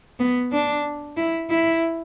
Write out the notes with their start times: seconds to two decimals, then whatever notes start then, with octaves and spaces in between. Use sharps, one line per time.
0.19 B3
0.52 D4
1.17 E4
1.50 E4